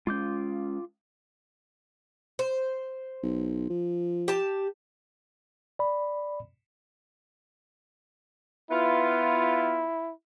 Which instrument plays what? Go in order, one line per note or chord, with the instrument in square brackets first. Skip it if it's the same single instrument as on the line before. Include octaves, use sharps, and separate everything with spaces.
[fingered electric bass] G#3 C#4 [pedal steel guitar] F4 D6 G6
[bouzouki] C5
[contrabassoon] B1
F3
[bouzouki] G4 A5
[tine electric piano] D5 B5
[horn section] B3 F4 [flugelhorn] E4